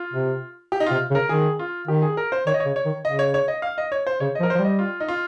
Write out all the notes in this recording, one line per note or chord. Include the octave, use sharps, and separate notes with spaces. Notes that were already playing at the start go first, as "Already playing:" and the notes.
Already playing: F4
C3
G4
D#4
C3 F4
C#3
A#4
D#3 G#4
F4
D#3 G4
G#4
A#4
C5
D#3 C#5
D#5
C#5
C#3
C#5
D#3
C#3 D#5
C#5
C#5
D#5
F5
D#5
C#5
C5
C#3 C#5
F3 D#5
A#4
C5
F3
G3
D#5
F4
D#4
F4